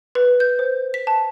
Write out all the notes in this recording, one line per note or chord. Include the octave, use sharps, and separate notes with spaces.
B4
G6
C5
B6
A5